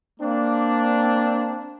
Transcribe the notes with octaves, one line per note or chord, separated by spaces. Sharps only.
A#3 C4 D4